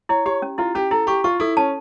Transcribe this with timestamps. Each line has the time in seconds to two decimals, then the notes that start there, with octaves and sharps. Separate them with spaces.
0.09 E4 C#5
0.26 G4 C#5
0.42 C#4
0.58 E4 F4
0.75 C#4 G4
0.91 E4 A4
1.07 G4 C#6
1.24 F4 C#6
1.40 E4 A4
1.57 C#4 A5